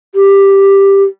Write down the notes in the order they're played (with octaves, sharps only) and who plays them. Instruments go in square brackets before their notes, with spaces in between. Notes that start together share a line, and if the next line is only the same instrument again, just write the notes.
[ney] G4